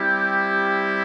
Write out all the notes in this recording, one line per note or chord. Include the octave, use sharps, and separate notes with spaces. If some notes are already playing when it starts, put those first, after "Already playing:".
Already playing: G3 C4 E4 G4